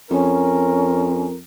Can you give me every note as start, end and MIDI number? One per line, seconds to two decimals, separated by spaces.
0.11 1.41 41
0.11 1.27 61
0.11 1.36 70